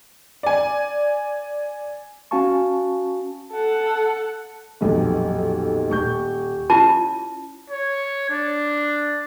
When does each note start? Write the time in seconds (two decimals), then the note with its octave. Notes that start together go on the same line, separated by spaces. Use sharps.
0.43 D5 G#5
2.31 C#4 F#4 F5 G#5 A5 C#6
3.53 A4 F#5
4.81 D#1 B1 F2
5.90 D#1 C#6 G6
6.70 C#4 E4 F4 A5
7.70 C#5
8.29 D4